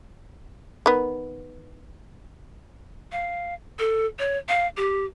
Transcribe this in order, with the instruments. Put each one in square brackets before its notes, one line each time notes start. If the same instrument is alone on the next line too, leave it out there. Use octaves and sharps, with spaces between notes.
[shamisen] D#3 B3
[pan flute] F5
A4
C#5
F5
G4